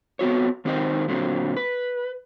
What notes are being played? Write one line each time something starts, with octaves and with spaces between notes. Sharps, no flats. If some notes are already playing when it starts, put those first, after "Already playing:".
B3 C4 F#4 C#5
D#3 C4 D#4 G4 C5 D#5
A#2 D3 F#3 A#3 C4
B4